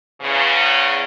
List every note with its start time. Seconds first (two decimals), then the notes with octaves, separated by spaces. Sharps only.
0.21 E2 C#3